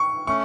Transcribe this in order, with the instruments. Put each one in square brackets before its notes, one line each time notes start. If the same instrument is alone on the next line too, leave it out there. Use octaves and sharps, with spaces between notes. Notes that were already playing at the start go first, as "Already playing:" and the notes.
Already playing: [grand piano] C#6
[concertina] A3 C#4 [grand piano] C#6